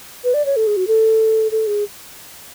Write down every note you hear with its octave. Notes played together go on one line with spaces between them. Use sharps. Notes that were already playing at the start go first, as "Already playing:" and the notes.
B4
D5
C#5
A4
G#4
F#4
A4
A4
G#4